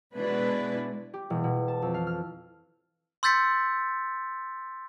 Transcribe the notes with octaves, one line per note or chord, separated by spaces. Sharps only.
B2 G#3 D4 E4 B4
G4
E1
B2
A5
F2
F5
F6
C6 E6 G6 A6 B6 C#7